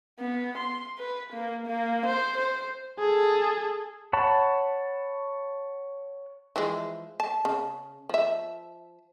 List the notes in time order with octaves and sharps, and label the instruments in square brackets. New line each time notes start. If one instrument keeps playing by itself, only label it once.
[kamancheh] B3
C6
B4
A#3
A#3
C5
C5
[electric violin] G#4 A4
[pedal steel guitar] C#5 F#5 A5 B5
[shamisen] E3 F3 G#3
A5
C#3
F3 E5